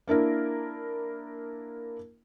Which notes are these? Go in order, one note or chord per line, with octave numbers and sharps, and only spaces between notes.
A#3 D4 E4 A#4